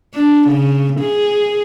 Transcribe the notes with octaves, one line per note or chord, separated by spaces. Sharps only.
D4
C#3
G#4